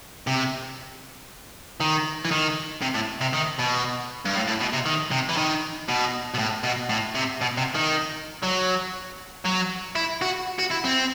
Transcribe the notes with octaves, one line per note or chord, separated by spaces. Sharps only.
C3
D#3
E3
D#3
C3
A2
C3
D#3
B2
G2
A2
A2
B2
C3
D#3
C3
E3
D#3
B2
B2
A2
B2
A2
C3
B2
C3
D#3
F#3
F#3
E4
F#4
F#4
E4
C4